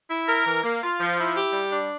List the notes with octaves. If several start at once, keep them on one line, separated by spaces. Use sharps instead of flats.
E4
A#4
E3
A#3
F4
F3
E4
G4
G3
D4